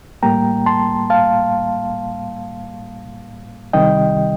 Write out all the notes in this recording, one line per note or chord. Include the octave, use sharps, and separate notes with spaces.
A2 G3 A#3 G5 A#5
A5 C6
F5 A5
C2 C3 D#3 G3 D#5 G5